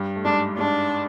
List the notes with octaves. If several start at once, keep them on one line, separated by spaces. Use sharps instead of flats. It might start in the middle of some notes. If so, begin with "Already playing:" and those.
Already playing: G2 G3
A3
G#2 G#3 D4
G#2 G#3 D4